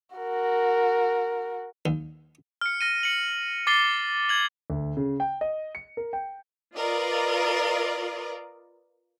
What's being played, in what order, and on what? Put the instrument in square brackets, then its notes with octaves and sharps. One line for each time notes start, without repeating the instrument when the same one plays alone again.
[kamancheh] F#4 A#4
[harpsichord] D#2
[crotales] F6 C#7
F6 A#6 D#7
C#7 F#7
D6 A6 C7 G7
G#6 F#7
[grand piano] D2
C#3
G5
D#5
C#7
A#4
G5
[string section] F4 A#4 B4 D5 D#5 A#5